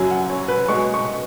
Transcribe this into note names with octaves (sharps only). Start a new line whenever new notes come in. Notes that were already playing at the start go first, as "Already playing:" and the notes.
Already playing: F#2 C#3 F#3 G#5
F#5
C#5
B4
B2 G#3 C#6
C#6